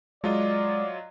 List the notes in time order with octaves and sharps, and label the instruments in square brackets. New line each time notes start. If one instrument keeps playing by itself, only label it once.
[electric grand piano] F#3 F4 D#5 [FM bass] G#3 [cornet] D5